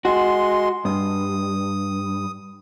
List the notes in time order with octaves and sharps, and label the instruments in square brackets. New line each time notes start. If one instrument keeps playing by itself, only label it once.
[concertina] G#3 C6 [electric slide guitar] F#4
[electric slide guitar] G2 [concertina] D#6